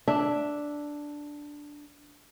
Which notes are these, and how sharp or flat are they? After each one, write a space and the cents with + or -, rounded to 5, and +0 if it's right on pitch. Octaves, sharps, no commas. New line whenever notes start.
D4 +0 E5 +0